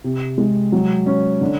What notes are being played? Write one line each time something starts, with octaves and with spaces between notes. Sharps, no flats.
C3
G#3
F#3
C#4
D3